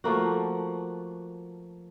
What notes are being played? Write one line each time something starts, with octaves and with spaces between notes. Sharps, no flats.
F3 A3 A#3 F#4